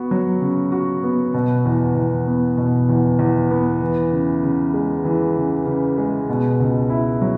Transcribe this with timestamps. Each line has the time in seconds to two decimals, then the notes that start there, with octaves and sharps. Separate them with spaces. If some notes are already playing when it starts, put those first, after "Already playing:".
Already playing: B3 F#4
0.11 F#3
0.41 C#3
0.72 F#4
1.03 B3
1.34 B2
1.65 E2
1.95 E2
2.27 B3
2.57 B2
2.89 E2
3.19 E2
3.51 B3
3.81 E3
4.12 C#3
4.43 C#3
4.74 G#3
5.05 E3
5.36 C#3
5.66 C#3
5.98 G#3
6.29 B2
6.60 C#2
6.90 E4
7.21 F#3